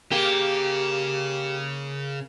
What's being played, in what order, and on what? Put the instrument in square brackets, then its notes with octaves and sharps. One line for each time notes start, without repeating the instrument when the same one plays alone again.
[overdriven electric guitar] C#3 [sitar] A#3 [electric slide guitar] G4